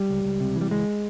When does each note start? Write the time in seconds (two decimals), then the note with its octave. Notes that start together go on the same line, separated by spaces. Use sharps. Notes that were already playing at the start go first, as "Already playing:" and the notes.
Already playing: G3
0.09 C#2
0.25 C#2
0.40 C3
0.56 E3
0.61 G3
0.71 C#2 G#3